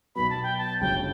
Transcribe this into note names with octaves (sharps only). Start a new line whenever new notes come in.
B1 B2 F#3 B3 B5
A5
G5
A5
G1 F#2 C#3 F#3 C#4 G5